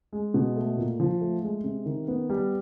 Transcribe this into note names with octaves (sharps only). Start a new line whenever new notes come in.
G#3
B2
A3
A#2
F3
A3
G#3
C3
D#3
B3
G3